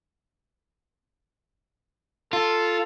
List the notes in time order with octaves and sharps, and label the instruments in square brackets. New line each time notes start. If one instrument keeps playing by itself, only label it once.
[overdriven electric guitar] F4 [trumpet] A4